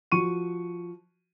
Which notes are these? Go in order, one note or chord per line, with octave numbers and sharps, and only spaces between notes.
F3 F#4 C#6 D#7